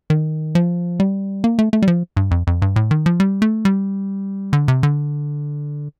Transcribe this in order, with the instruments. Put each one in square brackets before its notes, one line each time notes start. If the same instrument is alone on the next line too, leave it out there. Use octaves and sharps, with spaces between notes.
[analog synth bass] D#3
F3
G3
A#3
A3
A3
G3
F3
G2
F2
F2
G2
A2
D#3
F3
G3
A3
G3
D3
C3
D3